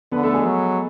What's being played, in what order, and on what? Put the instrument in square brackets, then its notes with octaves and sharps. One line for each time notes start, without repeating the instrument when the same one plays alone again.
[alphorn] D3 [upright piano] B3 B4
[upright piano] A3 A4
G#3 G#4
[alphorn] F#3